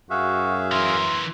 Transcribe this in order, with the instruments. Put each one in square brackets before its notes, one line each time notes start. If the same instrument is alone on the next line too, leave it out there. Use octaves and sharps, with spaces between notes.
[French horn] F#2 [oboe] F#4 [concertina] G#4 E5 F5
[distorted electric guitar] E3 A#4 [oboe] C6